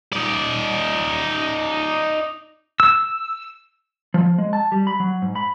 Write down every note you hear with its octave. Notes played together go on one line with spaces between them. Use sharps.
D#4 D5
E6
F3
G#3
A5
G3
B5
F#3
G#2
B5